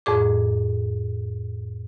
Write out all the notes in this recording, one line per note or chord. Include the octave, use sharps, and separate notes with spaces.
F2 A2 G#4 D6